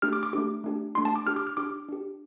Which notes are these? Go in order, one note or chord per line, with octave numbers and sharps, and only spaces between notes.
A3 D4 G4 F6
D6
D6
A3 D4 G4 D6
A3 D4 G4
A3 D4 G4 C6
A5
D6
D4 G4 F6
D6
F6
D4 G4 D6
D4 G4